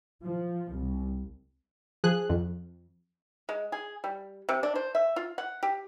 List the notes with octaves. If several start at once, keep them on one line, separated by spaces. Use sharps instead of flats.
F3
C2
F3 G#4 F#6
F2
G#3
G#4
G3
C3
D4
C5
E5
F4
F#5
G4